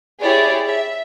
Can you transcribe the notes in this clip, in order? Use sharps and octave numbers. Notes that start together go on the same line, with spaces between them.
E4 G4 G#4 C#5 D5
E5